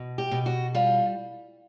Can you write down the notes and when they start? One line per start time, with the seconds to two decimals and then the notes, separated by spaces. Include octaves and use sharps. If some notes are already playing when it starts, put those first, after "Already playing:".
Already playing: B2
0.18 G4
0.31 B2
0.46 F#4
0.75 G3 F4